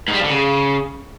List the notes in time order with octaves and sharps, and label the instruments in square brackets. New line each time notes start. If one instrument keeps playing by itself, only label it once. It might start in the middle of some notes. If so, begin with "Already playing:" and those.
[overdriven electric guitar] G#2
G3
F3
D3
C#3